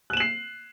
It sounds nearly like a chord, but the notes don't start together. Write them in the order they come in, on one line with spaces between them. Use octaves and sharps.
F#6 E7 F#7 C7